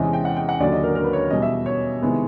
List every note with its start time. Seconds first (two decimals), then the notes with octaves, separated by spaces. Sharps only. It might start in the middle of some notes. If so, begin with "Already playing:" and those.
Already playing: E2 C3 E3 G#3 C#4 D#5
0.13 G5
0.25 F#5
0.37 G5
0.49 F#5
0.60 D#2 D3 F#3 D5
0.72 D#5
0.84 A#4
0.95 A#4
1.04 B4
1.13 C#5
1.30 E2 B2 G3 D#5
1.42 E5
1.66 C#5
2.02 C3 D#3 G#3 B3 E4